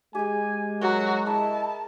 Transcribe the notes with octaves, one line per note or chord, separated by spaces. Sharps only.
G#3 G4 G#4 G#5
F#3 F#4 A#4
E4 G#4 D#5 A5